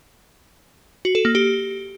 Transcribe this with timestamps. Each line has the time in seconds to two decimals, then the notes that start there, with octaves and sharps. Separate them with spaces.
1.05 F#4
1.15 A4
1.25 A#3
1.35 G4